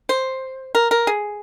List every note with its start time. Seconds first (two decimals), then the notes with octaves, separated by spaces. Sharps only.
0.09 C5
0.75 A#4
0.91 A#4
1.07 G#4